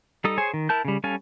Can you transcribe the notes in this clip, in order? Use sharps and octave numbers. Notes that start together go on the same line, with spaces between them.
G3 D#4 A4 D#6
G#4 C5 C#5 G#5
D#3
E4 A#4 A5 G6
C#3 G3
G3 C#4 A4 F5 G#5